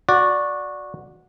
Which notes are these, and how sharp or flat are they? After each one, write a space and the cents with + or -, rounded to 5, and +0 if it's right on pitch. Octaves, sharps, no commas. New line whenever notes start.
F#4 -15 D5 +0